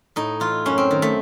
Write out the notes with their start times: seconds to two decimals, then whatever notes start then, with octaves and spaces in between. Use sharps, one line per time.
0.16 A2 D#4
0.40 E3 F4
0.66 F#2 C#4
0.78 C4
0.91 D#3
1.02 A3